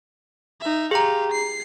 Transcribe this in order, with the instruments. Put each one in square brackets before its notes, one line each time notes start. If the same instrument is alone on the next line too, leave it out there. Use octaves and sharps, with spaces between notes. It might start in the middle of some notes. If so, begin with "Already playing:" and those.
[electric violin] D#4 E5
[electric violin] G4 F5 [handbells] G#4 A#5
[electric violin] C7